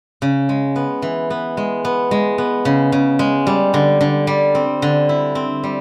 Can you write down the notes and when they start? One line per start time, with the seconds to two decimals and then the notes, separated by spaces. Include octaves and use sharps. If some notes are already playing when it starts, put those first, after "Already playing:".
0.22 C#3
0.49 G#3
0.76 B3
1.02 E3
1.30 B3
1.57 G#3
1.85 B3
2.11 G#3
2.38 B3
2.65 C#3
2.92 C#3
3.19 G#3
3.47 G3
3.74 D3
4.01 D3
4.27 G3
4.55 C4
4.82 D3
5.09 E4
5.35 C4
5.64 G3